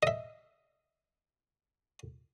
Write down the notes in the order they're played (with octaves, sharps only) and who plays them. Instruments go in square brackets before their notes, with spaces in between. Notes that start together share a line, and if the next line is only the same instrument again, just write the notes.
[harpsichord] D#5 E5